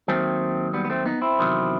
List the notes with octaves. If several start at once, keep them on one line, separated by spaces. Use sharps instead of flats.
D#2 D#3 F#3 A3 C4
G3 B3
B3
A3 C4
B3 D#4
C4 E4
E2 C3 D#3 F#3